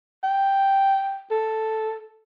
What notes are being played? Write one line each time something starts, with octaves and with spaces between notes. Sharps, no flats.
G5
A4